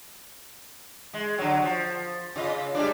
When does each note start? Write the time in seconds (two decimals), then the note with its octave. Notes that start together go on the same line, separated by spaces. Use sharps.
1.14 G#3
1.38 D3 F#3
1.62 F3
2.36 C#3 F4 D#5
2.75 G3 G#3 D4